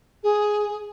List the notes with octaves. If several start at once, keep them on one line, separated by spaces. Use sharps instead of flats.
G#4